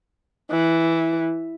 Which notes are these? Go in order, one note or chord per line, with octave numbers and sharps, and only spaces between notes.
E3